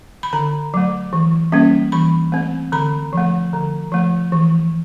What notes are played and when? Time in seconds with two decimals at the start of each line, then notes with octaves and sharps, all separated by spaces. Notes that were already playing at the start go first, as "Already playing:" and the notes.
0.23 B5
0.33 D3 A#5
0.74 F#3 A3
1.13 E3
1.52 G3 A#3 C#4
1.92 E3 B5
2.32 A3 C4
2.72 D3 B5
3.13 F3 A3
3.53 D3
3.92 F3 A3
4.32 E3